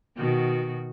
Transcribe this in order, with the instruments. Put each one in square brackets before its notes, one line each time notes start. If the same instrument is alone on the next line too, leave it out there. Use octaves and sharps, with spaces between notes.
[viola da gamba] B2 D#3 F#4